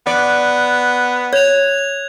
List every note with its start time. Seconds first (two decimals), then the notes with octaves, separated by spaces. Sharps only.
0.07 B3 D5 F#6
1.33 C#5 G#6 F7